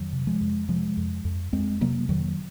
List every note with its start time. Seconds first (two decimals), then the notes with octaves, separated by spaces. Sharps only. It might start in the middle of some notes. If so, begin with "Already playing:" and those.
Already playing: F2 D#3 F#3
0.13 C3
0.27 F3 G#3
0.41 F2
0.69 C3 F3 G#3
0.97 F2
1.25 F2
1.53 F2 G#3 C4
1.81 C3 F#3 A#3
2.09 F2 D#3 F#3